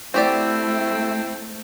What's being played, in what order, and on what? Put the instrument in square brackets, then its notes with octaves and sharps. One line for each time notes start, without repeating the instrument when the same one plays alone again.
[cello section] A3 [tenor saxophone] C4 [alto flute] E4 [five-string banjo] F#4 G4 D5